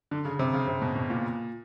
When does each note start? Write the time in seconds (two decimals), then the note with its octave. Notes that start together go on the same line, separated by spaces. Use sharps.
0.11 D3
0.25 C#3
0.39 C3
0.54 C#3
0.67 C3
0.82 B2
0.96 B2
1.10 A#2